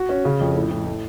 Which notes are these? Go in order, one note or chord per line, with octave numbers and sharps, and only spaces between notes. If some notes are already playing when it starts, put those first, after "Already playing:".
Already playing: F#4
C#4
C#3
F2
A2
A2
A2